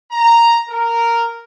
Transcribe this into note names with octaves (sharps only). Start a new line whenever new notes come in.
A#5
A#4